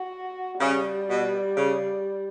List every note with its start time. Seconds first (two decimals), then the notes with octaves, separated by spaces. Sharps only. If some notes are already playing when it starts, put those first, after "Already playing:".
Already playing: F#4
0.60 C#3 G3
1.08 B2
1.57 C#3